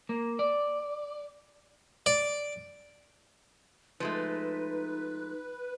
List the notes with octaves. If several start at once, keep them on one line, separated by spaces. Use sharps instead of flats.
A#3
D5
D5
F3 G#3 A3 D#4 B4